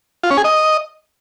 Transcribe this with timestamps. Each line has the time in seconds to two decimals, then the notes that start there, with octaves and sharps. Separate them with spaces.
0.23 F4
0.30 C#4
0.37 G#4
0.44 D#5